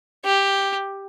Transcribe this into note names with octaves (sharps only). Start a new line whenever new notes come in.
G4